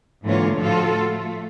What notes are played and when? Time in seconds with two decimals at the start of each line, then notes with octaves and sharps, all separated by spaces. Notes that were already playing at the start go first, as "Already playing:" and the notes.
0.24 G#2 D3 E3 A#3 F4 C#5
0.55 A2 F3 F4 F#4 A4
1.09 A3